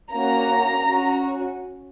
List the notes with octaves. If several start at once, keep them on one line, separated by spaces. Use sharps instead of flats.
A#3 C#4 F#4 A#5
C#4 F#4